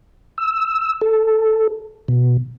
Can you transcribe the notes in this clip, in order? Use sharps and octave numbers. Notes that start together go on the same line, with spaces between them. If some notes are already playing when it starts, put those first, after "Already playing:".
E6
A4
B2